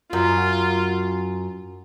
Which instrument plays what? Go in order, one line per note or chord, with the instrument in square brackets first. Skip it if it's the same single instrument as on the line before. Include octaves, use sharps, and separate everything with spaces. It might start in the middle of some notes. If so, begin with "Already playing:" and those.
[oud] F#2 [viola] F4